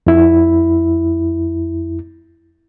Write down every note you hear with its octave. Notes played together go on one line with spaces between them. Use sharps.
F2 E4